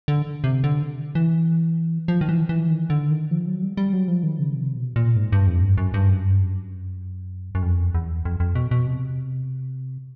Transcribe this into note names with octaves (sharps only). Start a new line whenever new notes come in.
D3
C3
D3
E3
F3
D#3
E3
E3
D#3
D3
D#3
F3
F#3
G3
G3
F#3
F3
D#3
C#3
C3
B2
A#2
G#2
G2
F2
G2
F#2
G2
F#2
G2
F#2
F#2
F2
E2
F2
F2
B2
B2
C3